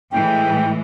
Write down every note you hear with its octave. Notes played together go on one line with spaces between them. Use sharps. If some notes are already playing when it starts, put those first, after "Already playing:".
A2 E3 G#3 G5